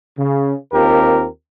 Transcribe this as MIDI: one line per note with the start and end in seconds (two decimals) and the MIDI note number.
0.19 0.55 49
0.73 1.26 39
0.73 1.26 60
0.73 1.26 65
0.73 1.26 67
0.73 1.26 70